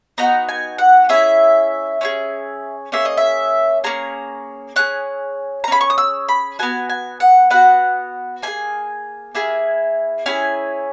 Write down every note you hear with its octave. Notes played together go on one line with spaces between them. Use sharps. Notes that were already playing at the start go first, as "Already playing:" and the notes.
B3 D#4 F#4 A#5
G#5
F#5
C#4 E4 G#4 E5
C#4 E4 G#4
A#3 C#4 G#4 E5
D#5
E5
A#3 C#4 G#4 A#5
C#4 G#4 F#6
A#5
C#4 G#4 B5
C#6
D#6
E6
B5
B3 F#4 G#5
G#5
F#5
B3 F#4 F#5
A#3 E4 G#4 G#5
A#3 E4 G#4
C#4 E4 G#4 G#5